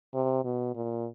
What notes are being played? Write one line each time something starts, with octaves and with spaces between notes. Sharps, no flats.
C3
B2
A#2